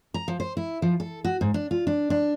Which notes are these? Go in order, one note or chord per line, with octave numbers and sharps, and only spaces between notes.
A#5
F3
C5
E4
F3
A4
F#4
G#2
D4
F4
D4
D4